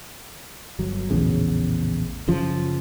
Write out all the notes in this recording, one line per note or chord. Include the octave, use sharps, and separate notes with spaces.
G1 F#3
A#1 E2 A2 C#3
F#1 C#3 F3